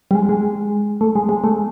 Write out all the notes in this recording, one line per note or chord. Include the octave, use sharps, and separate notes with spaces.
G3
G#3
G#3
A3
G#3
G#3
A3